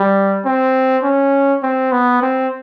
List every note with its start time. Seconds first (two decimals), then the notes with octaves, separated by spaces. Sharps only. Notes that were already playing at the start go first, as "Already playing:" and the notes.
Already playing: G3
0.45 C4
1.04 C#4
1.63 C4
1.92 B3
2.22 C4